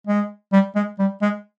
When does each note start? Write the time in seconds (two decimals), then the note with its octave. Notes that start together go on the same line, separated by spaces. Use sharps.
0.07 G#3
0.53 G3
0.75 G#3
0.99 G3
1.22 G#3